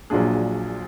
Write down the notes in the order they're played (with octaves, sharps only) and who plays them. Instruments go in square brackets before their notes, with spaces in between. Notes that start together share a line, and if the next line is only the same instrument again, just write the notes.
[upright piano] A#1 A#2 F#3 D4 G#4